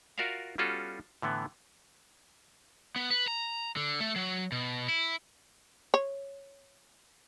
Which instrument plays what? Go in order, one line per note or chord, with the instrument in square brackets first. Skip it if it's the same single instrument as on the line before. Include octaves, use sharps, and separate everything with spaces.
[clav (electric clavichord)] F4 F#4 A#4 D5 E5 F5
G3 B3 C#4 F4 F#4 A4
A2 D3 E3 B3
[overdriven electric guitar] B3
B4
A#5
D3
A3
F#3
B2
E4
[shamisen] C#5